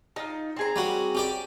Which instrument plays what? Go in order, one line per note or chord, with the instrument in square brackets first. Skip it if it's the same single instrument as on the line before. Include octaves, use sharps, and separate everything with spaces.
[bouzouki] D#4 F4
C4 G#4 A#5
[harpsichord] G3 C#4 F#4
C#4 G4 D5